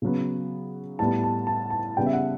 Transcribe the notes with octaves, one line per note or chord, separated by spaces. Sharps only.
C#3 F#3 B3
A2 G3 B3 A5
A5
A5
A5
C#3 G3 B3 G5
E5
F#5